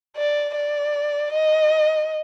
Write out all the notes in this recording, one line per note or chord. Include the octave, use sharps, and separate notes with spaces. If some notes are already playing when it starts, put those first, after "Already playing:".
D5
D5
D#5